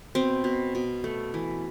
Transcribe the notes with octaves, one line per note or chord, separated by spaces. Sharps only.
B2 C4
B2
B2
A3
E3